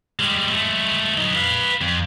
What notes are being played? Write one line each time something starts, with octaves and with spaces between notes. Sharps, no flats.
G3 G#3
G#3 A3
F#3 D#4
B4 F5
F2